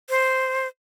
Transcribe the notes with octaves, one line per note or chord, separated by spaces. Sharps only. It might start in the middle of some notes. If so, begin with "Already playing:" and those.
C5